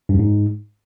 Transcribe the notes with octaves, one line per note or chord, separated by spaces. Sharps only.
G2
F#2
G#2